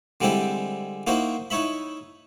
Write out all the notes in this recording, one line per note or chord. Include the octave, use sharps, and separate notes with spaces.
D3 G3 G#3 C4 E4 G4
A#3 D#4 E4 F#4 C5
D#4 E4 C#5 E5 B5